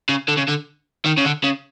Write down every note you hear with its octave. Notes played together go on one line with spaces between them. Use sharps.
C#3
D3
C#3
D3
D#3
C#3
D3
C#3